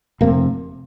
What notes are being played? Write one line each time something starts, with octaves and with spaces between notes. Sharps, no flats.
F1 C3 A#3